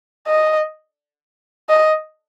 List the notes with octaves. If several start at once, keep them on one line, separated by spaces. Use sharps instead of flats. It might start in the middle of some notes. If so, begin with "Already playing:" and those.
D#5
D#5